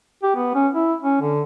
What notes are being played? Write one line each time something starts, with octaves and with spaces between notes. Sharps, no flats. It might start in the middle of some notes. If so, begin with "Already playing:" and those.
G4
B3
C#4
E4
C#4
D3